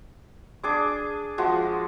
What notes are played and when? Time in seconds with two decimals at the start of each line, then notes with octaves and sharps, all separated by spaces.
0.63 D4 G#4 D6
1.38 F3 G#3 F#4